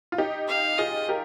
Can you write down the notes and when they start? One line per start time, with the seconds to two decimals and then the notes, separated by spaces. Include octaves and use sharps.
0.12 F4
0.18 D#4 G4
0.48 F5
0.78 F4 G#4 D#5
1.09 G4 A#4